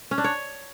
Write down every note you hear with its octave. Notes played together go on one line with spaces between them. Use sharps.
C#4
D4
C#5